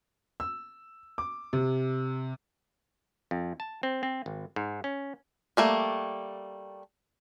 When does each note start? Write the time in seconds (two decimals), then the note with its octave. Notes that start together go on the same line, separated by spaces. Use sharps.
0.40 E6
1.18 D6
1.53 C3
3.31 F2
3.60 A5
3.83 C4
4.03 C4
4.26 G#1
4.56 G#2
4.84 C#4
5.57 G3 A3 A#3